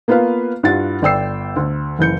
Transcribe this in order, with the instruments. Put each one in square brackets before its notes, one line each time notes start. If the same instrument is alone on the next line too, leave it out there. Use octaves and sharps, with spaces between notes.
[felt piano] A#3 B3 F4 B4 F5
G2 E4 F4 F#5 A6
G1 D5 G5 E6 C7
D2
F#1 E3 G6 C#7